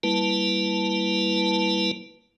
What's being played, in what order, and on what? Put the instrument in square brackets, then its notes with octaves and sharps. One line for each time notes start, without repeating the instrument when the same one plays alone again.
[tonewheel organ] G3 A#3 E4 B4 A5